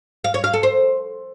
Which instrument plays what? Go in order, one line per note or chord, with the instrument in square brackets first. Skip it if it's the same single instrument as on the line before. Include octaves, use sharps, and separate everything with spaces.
[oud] F5
C#5
F5
A4
C5